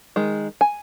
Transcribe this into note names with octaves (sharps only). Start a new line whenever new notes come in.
D#3 G#3
G#5